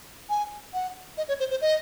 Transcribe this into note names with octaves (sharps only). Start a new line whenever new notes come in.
G#5
F#5
D#5
C#5
C5
C5
D#5